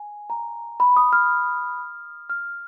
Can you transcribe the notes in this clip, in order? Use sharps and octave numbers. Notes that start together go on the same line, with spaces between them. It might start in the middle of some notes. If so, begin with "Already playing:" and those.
Already playing: G#5
A#5
B5
D#6
F6
F6